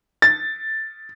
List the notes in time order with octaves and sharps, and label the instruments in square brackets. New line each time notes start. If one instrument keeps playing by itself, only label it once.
[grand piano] A6